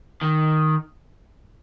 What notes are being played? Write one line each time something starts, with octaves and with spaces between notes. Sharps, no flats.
D#3